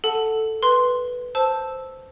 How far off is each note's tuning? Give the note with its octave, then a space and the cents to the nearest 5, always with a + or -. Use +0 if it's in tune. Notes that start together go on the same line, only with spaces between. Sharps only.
A4 +0 F#5 +0 A5 +0
B4 +0 C6 +0
C5 +0 A5 +0 E6 -5